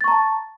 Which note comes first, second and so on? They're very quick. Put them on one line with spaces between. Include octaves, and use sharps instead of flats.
A6 C#6 A#5 A5